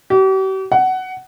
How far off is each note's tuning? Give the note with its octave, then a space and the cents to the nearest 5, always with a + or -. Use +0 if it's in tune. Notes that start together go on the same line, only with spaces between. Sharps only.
G4 -45
F#5 +15